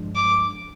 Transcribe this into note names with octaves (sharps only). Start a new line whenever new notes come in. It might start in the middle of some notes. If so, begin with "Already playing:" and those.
Already playing: G2 F3 G#3 D4
D6